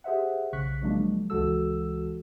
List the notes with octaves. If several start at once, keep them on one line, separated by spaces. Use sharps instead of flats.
G4 G#4 C5 E5 F#5
B1 C#3 C#6 F#6 B6
F3 F#3 G#3 A#3 D4
C#2 E3 G#3 F#4 A4 E6